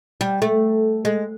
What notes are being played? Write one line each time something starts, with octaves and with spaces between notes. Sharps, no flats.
G3
A3
G#3